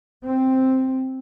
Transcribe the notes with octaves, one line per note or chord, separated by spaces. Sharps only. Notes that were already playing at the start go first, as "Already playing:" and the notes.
C4